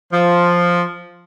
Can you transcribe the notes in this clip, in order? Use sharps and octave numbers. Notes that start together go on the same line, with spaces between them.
F3